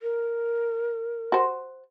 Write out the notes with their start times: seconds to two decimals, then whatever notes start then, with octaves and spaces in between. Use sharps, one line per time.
0.02 A#4
1.32 F#4 C5